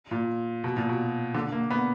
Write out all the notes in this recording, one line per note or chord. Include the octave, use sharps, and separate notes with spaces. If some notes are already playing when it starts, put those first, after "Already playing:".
A#2
B2
A#2
B2
D3
A#3
B3